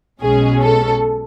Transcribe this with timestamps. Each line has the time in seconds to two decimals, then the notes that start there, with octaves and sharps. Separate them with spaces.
0.21 B1 B2 G#3 C#4 G#4
0.62 A4